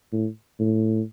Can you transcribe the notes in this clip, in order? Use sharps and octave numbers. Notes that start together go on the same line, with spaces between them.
A2
A2